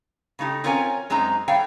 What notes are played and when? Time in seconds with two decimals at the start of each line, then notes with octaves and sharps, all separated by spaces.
0.39 C#3 A3 D#4 G4
0.64 C4 C#4 F4 A#4 C#5 G#5
1.10 F#2 G#3 C4 D#4 A#5
1.48 G3 A3 C#5 F5 G5